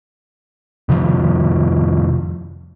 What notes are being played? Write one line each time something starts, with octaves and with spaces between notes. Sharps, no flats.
F2 C3 D#3 F3